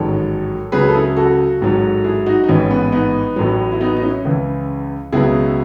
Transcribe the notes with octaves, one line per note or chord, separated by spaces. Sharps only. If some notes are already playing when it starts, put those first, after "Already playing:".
Already playing: A1 G#2 D#3 F#3 A4 C#5
C#2 C#3 F#3 G#4 B4
A4
E4 G#4
F#4 A4
A1 G#2 F#3
E4 G#4
D#4 F#4
D#4
A1 G#2 E3 C#4
B3
B3 D#4
A1 A2 F#3
E4
B3 D#4
D#4
C#4 E4
C#2 C#3 E3
C#2 B2 F#3 E4 G#4